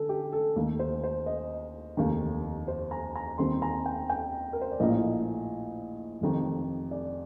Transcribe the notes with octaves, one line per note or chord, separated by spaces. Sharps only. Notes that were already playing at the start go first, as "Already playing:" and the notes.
Already playing: D3 A4
G4
A4
D#2 D#3 A3
C5
C5
D#5
F1 D#2 D#3
C5
A#5
A#5
D#2 D#3 G3 C4 C6
A#5
G5
G5
A#4
C5
D5
A#1 A2 F3 A#3 D#5
F1 F2 D#3
D5